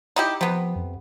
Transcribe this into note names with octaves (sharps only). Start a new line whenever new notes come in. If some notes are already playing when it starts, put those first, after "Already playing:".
D#4 E4 G4
C3 F3 B3
F2